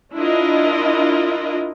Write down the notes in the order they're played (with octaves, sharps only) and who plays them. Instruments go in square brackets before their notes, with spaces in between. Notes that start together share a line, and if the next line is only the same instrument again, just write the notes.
[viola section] D4 E4 F4 A#4 D#5